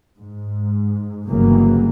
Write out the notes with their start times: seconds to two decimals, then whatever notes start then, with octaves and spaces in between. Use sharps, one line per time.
0.19 G#2
1.26 G1 C#3 E3 F#3 G3 A#3